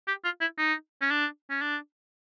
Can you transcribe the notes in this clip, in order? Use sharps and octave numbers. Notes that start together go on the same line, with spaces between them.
G4
F4
E4
D#4
C#4
D4
C#4
D4